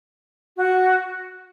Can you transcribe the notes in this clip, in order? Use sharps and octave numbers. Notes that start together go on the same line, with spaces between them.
F#4